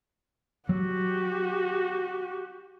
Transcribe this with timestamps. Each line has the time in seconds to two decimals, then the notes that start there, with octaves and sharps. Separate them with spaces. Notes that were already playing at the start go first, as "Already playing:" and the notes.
0.69 F#3 F#4 G4